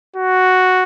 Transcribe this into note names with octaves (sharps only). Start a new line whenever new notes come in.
F#4